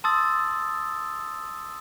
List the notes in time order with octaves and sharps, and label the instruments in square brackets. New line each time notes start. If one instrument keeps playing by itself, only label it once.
[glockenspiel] A5 C6 D#6 E6 A6